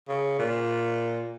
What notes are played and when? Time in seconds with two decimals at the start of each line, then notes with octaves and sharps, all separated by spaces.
0.08 C#3
0.39 A#2